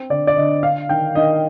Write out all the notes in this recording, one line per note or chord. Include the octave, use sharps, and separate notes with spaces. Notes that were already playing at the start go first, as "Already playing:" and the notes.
Already playing: C4
D3 D5
D5
D3 D#5
D4 F5
D#3 G5
D#3 D#5